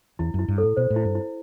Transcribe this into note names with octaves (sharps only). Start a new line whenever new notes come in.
E2 E4
F#2
E4
G2
A2 A4
B2 C5
A2
E4
G2
E4